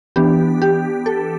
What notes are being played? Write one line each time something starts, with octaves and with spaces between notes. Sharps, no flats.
E3 B3 D4 G4
G4
A4